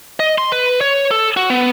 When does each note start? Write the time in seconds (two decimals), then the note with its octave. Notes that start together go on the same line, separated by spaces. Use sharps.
0.20 D#5
0.38 C6
0.52 B4
0.81 C#5
1.11 A4
1.37 F#4
1.50 B3